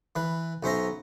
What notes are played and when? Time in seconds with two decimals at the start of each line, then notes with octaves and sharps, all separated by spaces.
0.16 E3 B4
0.63 B1 C#4 C5 E5 A#5